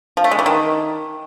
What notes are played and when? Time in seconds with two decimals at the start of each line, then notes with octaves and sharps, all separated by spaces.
0.17 F3
0.24 A3
0.31 G#3
0.39 E3
0.46 D#3